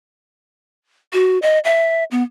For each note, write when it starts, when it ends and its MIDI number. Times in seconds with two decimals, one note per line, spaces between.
1.13 1.39 66
1.42 1.59 75
1.65 2.04 76
2.11 2.23 59